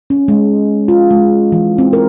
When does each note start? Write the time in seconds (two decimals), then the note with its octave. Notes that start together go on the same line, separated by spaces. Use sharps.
0.10 C#4
0.28 G#3
0.88 F4
1.11 G#3
1.52 E3
1.78 C4
1.93 A#4